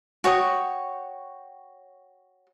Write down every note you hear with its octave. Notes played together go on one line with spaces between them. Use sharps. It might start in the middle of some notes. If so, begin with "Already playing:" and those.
F#4 C#5 G5 D#6